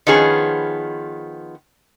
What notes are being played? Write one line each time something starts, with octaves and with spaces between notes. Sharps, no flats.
D#3 F3 B3 C#4 G#4